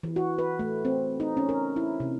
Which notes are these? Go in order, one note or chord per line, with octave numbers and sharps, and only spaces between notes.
E3
F#4
B4
A3
C4
D#4
C#4
A#4
E4
C3